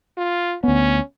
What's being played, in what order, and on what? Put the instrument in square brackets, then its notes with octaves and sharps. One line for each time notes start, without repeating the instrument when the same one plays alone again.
[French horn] F4
[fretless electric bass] D2 B3 [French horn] C#4